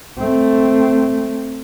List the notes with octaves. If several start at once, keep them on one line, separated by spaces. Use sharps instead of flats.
A3 C4